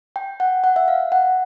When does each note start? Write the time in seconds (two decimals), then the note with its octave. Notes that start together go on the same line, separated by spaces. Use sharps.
0.16 G5
0.40 F#5
0.64 F#5
0.76 E5
0.88 F5
1.12 F#5